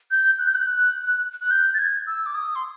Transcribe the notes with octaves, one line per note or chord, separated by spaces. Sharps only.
G6
F#6
G6
F#6
F#6
G6
A6
G#6
E6
D6
D#6
C6